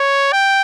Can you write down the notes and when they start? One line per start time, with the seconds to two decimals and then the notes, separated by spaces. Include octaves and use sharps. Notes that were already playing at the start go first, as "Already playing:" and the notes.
Already playing: C#5
0.32 G5